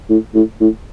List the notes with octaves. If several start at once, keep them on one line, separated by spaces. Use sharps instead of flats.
A2
A2
A2